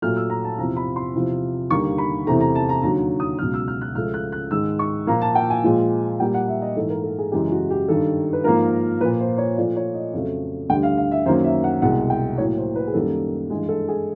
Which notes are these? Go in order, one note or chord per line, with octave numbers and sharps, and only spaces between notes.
A#2 F#3 A3 F6
E6
A#5
A5
E2 C3 F3 A#5
B5
C6
E2 C3 F3
D#2 D3 G3 A#3 C#6
B5
E2 C3 E3 A3 A#5
A#5
A5
A#5
D#2 D3 F#3 A#5
D#6
C#2 B2 F#3 F6
E6
F6
F#6
C#2 C#3 F3 A3 F6
F#6
F#6
G#2 D#3 G#3 E6
C#6
A#2 F3 A#3 A#5
A5
G5
G#5
A#2 F3 G#3
A#2 G3 A#3 G5
F#5
E5
D#5
G#2 E3 A3 A4
A#4
A4
G#4
F#2 C#3 E3 G#3 G4
F#4
G4
G2 D#3 G3 A4
B4
G#2 F3 A#3 A#4
A#2 F3 A#3 B4
C5
C#5
A#2 F3 A3 D5
C#5
D#5
F2 C#3 F#3 A3
D2 D3 G3 G5
F5
F5
E5
F#2 D#3 F#3 A#3 C5
E5
F#5
C2 B2 G#3 F#5
G5
A2 F#3 A#3 C#5
C5
B4
G#4
F#2 D#3 G3 A#3 A4
G2 E3 G#3 G#4
A4
G#4